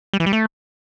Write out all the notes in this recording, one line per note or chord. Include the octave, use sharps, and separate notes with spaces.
G3
E3
G3
A3